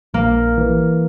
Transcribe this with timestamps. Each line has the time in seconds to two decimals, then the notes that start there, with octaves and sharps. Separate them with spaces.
0.14 A#1 A#3
0.57 E3